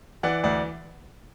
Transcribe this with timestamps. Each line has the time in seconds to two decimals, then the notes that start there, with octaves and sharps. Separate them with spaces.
0.23 E3 D5 F#5
0.44 D2 D5 F#5